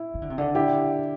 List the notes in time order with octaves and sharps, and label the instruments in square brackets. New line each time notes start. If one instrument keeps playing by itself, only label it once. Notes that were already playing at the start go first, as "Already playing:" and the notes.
Already playing: [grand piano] E4
[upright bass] E3
D3
C3
D3
[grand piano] E4 G4